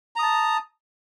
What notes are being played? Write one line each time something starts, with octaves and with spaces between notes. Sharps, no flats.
A5 A#5 D#6